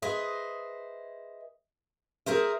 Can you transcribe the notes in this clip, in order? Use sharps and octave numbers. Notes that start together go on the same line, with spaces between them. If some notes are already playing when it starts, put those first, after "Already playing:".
G#4 B4 C5 D#5 E5
G#4 A#4 C5 E5